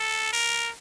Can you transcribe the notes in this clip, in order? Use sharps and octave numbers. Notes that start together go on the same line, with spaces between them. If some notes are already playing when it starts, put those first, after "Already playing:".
Already playing: A4
A#4